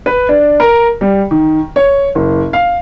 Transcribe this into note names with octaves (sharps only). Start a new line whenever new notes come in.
B4
D4
A#4
G3
D#3
C#5
F#1
F5